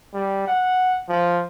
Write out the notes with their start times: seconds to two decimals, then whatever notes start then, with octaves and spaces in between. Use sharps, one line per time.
0.14 G3
0.47 F#5
1.09 F3